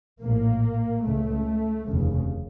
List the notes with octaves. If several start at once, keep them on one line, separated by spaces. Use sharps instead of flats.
A#1 A2 A#3
C#2 C#3 A3
F1 D#2 C#3